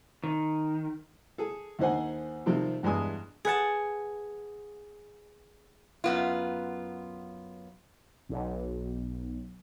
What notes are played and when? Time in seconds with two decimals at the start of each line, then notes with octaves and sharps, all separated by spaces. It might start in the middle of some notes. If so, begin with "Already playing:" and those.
0.24 D#3
1.38 G#4 A4
1.79 D#2 D3 D#4 C5 F#5 G#5
2.46 C3 D#3 F3 G3 A3 C4
2.83 E2 G2 G#3 G#5 D#6
3.45 G#4 B4 F#5 A5
6.04 F#2 B3 F4
8.29 B1